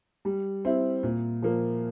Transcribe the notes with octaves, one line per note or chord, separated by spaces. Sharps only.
G3
C4 E4
A#2
F3 A#3